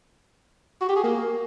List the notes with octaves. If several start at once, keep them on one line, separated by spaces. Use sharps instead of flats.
F#4
G4
G#4
A#3